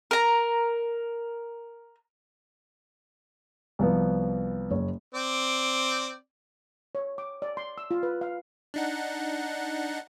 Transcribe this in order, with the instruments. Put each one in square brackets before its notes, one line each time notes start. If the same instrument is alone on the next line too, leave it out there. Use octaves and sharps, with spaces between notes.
[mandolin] A#4 A#5
[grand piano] C2 F3 B3
F#1 C#5
[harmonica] C4 D5
[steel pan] C#5
D6
D5
C6
E6
F4
B4
F5
[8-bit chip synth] D4 D#4 F#5